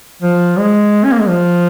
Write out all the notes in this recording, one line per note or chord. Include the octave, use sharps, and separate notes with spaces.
F3
G#3
C#4
A#3
G#3
F3